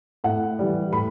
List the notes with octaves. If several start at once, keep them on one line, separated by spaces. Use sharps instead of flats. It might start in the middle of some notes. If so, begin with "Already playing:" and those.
A2 F#5
E3 G3
A2 B5